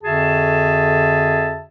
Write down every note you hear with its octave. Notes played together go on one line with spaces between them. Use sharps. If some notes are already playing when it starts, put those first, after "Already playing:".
F2 D3 F#4 G#4 E5 A5